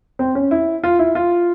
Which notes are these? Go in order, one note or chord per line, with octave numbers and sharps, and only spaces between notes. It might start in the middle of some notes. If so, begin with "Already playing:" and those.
C4
C#4
E4
F4
E4
F4